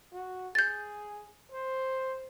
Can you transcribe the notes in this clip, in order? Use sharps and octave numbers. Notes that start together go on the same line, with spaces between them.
F#4
G#4 G6 A6
C5